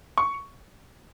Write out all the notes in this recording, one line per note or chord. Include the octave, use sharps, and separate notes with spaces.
C#6